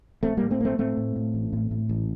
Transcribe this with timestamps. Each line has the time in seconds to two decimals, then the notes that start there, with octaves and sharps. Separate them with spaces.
0.23 A#1 A3 C4
0.37 A2 G3 A#3
0.51 A3 C4
0.60 A#1 A#3
0.65 A3 C4
0.78 A2 A3 C4
0.97 A2
1.16 A2
1.34 A1
1.53 A2
1.71 A2
1.89 A1